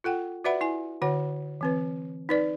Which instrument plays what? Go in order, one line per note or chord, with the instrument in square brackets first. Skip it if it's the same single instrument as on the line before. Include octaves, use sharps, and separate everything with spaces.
[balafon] F4 A4 F#5 G5
F#4 B4 D5 E5 F#5 B5
E4 G#5
D3 F#4 C#5 F#5
E3 C4 B4
D#4 B4 D5